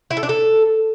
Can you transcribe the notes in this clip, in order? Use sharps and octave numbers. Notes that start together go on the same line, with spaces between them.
E4
A4
D4
A4